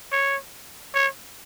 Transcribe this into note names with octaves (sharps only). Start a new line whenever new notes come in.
C#5
C#5